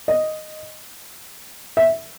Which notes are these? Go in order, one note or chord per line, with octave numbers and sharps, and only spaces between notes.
D#5
E5